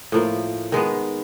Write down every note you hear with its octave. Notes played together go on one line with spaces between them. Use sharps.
A2 F3 A#3
D#3 G#3 B3